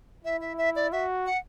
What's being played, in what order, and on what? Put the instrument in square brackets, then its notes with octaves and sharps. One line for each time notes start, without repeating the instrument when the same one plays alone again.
[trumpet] E4 [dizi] E5
[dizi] E5
E5
D5
[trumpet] F#4 [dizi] E5
[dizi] F#5